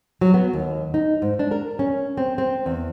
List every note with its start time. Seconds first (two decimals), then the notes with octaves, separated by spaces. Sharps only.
0.21 F#3
0.34 B3
0.53 D#2
0.94 D#4
1.22 G#2
1.39 D4
1.51 A#4
1.79 C#4
2.17 C4
2.38 C4
2.66 E2